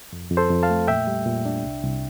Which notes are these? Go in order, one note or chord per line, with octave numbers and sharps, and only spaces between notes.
F2
F2
A4 C5
F2
F5 A5
A3
A#2 E5 G5
G3
A#2
D4
C2
C2